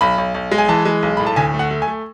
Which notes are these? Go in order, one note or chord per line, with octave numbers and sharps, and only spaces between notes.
B1 B5
B1
B1
G#3
G#5
E3 A5
G#3
B1
A2 B5
A5
D2 G#5
A3
F#5
A3
G#5
A3